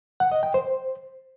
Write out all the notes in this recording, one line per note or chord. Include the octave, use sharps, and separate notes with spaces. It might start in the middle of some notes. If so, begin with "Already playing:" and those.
F#5
D#5
G5
C5